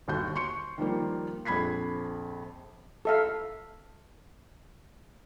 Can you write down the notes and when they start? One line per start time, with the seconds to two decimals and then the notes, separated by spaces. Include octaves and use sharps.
0.08 G1 D#2 F#4 G6
0.35 C6 C#6 C#7
0.78 D#3 F3 G3 A#3
1.45 A#1 F2 B5 G#6 B6 C7
3.05 A4 E5 F5